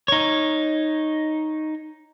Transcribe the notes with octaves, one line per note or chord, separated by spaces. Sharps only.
D#4 C#5